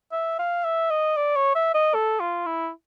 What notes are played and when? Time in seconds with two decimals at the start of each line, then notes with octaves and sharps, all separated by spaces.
0.12 E5
0.39 F5
0.65 E5
0.90 D#5
1.17 D5
1.36 C#5
1.55 E5
1.74 D#5
1.94 A4
2.20 F4
2.46 E4